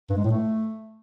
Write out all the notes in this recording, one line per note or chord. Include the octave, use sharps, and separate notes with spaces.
G2
G#3
A2
A3